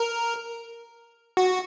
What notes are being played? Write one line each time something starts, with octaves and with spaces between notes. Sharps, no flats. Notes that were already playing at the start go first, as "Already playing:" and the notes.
Already playing: A#4
F#4